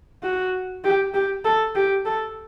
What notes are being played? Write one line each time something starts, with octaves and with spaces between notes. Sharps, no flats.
F#4
G4
G4
A4
G4
A4